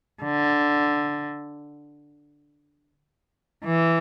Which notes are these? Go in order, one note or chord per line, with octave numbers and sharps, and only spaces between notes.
D3
E3